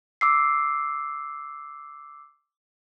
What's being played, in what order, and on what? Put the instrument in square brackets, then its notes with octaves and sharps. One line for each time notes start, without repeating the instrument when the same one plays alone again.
[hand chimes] D6 E6 C7